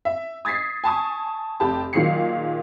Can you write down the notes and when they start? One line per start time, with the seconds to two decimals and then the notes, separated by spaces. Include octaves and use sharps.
0.05 E5
0.45 D#6 G#6 A6 B6 C7
0.84 G#5 A5 C#6 D#6
1.60 F1 G4 A5
1.93 A#2 D#3 F#3 G#4 C7 C#7